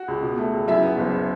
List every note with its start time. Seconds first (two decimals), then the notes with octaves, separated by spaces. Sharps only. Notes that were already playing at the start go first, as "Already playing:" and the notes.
Already playing: F#4 F#5
0.08 C#2
0.23 B2
0.38 A3
0.54 C#2
0.68 F#2 E4 E5
0.83 B3
0.97 F#1